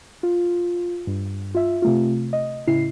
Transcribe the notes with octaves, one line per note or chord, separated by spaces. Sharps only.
F4
G2
F4 E5
C3 A3 F4
D#5
A2 C#3 E4 C7